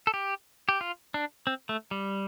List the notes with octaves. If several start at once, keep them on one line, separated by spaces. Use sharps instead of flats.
A4
G4
G4
F4
D4
C4
A3
G3